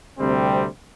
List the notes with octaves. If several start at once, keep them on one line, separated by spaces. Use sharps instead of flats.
D2 C3 G3 C4